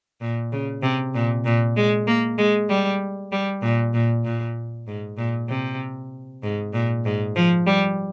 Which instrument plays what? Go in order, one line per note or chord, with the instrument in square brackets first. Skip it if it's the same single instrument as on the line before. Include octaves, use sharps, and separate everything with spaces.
[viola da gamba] A#2
C#3
C3
A#2
A#2
G#3
A#3
G#3
G3
G3
A#2
A#2
A#2
G#2
A#2
C3
G#2
A#2
G#2
F3
G3